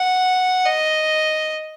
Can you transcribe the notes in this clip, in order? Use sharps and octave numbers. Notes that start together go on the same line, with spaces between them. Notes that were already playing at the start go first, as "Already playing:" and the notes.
Already playing: F#5
D#5